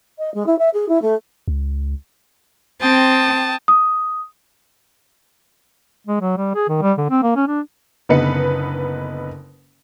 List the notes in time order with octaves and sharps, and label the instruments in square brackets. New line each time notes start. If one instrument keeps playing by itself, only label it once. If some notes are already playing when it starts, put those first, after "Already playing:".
[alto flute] D#5
G#3
E4
E5
G#4
E4
A3
[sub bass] C#2
[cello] C4 [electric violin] G5 D#6 [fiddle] A5
[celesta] D#6
[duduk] G#3
F#3
G3
G#4
D#3
G3
D3
C4
A#3
C#4
D4
[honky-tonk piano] F#1 D3 B3 D#4 B4 C#7